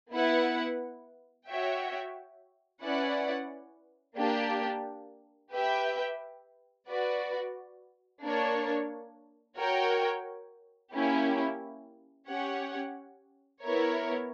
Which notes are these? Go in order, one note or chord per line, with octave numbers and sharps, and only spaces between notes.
B3 E4 B4 F#5
F#4 C#5 E5 G5
C#4 E4 B4 D5 F#5
A#3 D4 G4
G4 B4 E5 G5
F#4 B4 D5
A#3 D4 A#4 C#5
F#4 A#4 C#5 G5
A#3 C#4 E4 G4
C#4 G4 C#5 F#5
B3 E4 A#4 C#5